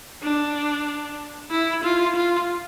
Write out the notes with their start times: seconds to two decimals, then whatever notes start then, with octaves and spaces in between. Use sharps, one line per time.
0.23 D4
1.51 E4
1.84 F4
2.16 F4